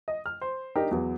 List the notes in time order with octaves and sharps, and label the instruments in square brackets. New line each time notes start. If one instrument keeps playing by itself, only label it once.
[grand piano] D#5
F6
C5
D4 D#4 G4 A#4
E2 F#3 B4